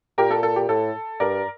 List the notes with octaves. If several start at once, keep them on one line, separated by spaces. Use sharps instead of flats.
A#2 G4 A#4
A4
A4
G4
A2 A4
G2 A#4 D5